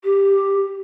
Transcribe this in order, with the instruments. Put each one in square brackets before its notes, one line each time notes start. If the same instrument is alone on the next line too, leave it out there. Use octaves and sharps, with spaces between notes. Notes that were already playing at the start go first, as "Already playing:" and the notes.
[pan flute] G4